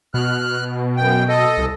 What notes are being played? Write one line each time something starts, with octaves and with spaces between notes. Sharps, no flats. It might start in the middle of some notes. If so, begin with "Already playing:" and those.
B2 F6 F#6
F#2 G5
A4 D#5
C2